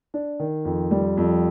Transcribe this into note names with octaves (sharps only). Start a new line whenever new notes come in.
D4
D#3
F2
G3
F2